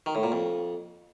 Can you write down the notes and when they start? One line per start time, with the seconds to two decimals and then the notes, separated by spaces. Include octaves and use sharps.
0.06 D#3
0.15 A2
0.23 A#2
0.32 F2